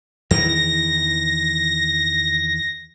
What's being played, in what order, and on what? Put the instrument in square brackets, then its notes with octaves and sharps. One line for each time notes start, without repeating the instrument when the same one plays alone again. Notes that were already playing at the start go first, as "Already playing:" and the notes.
[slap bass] E2 D#3 E3 [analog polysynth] A#6